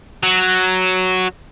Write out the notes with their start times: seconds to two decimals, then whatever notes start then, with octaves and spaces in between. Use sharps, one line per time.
0.23 F#3